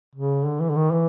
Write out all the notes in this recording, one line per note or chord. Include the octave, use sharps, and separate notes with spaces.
C#3
D3
E3
D3
D#3
E3